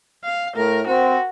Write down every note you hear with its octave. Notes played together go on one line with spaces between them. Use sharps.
F5
A2 A#4
C4 F#4